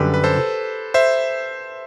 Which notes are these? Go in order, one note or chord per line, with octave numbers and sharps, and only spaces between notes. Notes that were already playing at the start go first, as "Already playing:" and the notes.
Already playing: F#2 D3 G3 G4 B4
B4
A4 C5
C5 E5